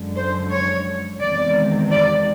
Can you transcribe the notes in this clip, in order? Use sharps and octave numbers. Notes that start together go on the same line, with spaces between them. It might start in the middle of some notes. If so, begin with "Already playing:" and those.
Already playing: F#2 D3 F3 G#3
C5
C#5
E2 C3 D#3 G#3 D5
D5